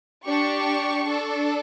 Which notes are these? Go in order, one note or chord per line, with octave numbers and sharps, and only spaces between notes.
D4 G4 C#6
D4 A4